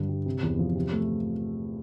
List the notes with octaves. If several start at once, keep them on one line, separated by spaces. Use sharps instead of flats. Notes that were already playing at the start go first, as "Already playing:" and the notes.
Already playing: G2 D3
G3
C3
E2
F3
C3
A3